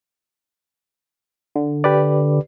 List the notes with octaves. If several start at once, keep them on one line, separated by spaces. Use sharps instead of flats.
D3
G4 B4 D5